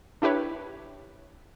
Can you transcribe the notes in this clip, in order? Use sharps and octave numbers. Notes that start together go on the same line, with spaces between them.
D4 E4 G4 B4 C#5